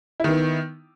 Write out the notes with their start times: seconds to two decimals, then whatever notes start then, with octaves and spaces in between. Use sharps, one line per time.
0.20 E4
0.24 D#3
0.29 B3